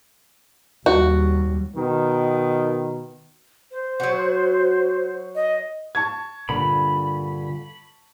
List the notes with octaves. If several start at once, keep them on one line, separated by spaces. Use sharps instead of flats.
D#2 G3 F#4
B2 D#3
C5
F#3 F#4
D#5
A5 C#6 G#6
G2 A#2 D3 B5